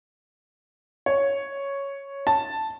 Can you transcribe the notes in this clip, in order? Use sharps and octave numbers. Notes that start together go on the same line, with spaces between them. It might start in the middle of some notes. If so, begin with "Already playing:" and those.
C#5
A5